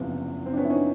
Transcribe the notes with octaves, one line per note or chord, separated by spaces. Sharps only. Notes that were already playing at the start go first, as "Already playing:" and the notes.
Already playing: F#1 E2 C3 F3 B3
C4
D4
B3 C#4
E4
C#4 D#4